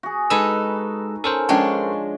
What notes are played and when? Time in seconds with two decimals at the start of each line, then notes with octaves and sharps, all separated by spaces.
0.03 F#4 G#4
0.30 G#3 D#4 A4 B4 E6
1.24 C#4 A4 A#4 C5
1.49 F3 G#3 C#4 D4 C#5 A5